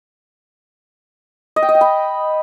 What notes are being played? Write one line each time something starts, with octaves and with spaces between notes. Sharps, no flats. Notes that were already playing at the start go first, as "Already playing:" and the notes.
D#5
G5
D#5
G5
B5